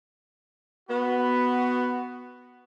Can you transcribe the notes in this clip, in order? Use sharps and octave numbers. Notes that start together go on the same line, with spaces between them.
B3 F#4